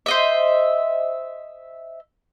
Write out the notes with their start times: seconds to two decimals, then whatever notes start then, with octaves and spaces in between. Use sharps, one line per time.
0.06 C5 D#5 E5